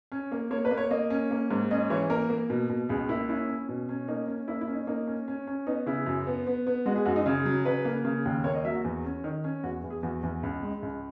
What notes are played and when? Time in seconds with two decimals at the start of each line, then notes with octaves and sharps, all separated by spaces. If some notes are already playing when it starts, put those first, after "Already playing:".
0.12 C#4
0.32 A#3
0.51 A#3 C#5
0.65 B4
0.71 A#3
0.77 C#5
0.91 A#3 D#5
1.10 C#4
1.31 A#3
1.51 G#2
1.71 C#4 D#5
1.90 E3 C#5
2.10 A#3 A#4
2.30 A#3
2.50 B2
2.70 B2
2.89 C#2 G#4
3.09 A#3 E4
3.29 C#4 E4
3.49 C#4
3.69 B2
3.89 C#4
4.08 A#3 D#4
4.28 C#4
4.48 A#3 E4
4.61 E4
4.68 C#4
4.74 D#4
4.87 A#3 D#4
5.07 C#4
5.28 C#4
5.47 C#4
5.67 B3 D#4
5.86 C#3 E4
6.06 F#2
6.27 B3
6.47 B3
6.67 B3
6.86 G#3 F#4
6.96 G#4
7.05 F#2 F#4
7.16 D#4
7.26 C#3 G#4
7.45 F#3
7.65 C#3 B4
7.85 A#3
8.05 C#3
8.26 D#2
8.44 A#3 C#5
8.55 D#5
8.65 F#3 E5
8.75 F#4
8.84 E2
9.05 C#4
9.24 D#3
9.44 C#4
9.63 E2 F#4
9.84 E2
9.90 G#4
10.03 E2 F#4
10.23 E2
10.43 C#2
10.63 G#3
10.83 C#2